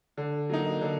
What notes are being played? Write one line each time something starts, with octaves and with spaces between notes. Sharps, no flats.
D3
F#3 A#3 D#4
D3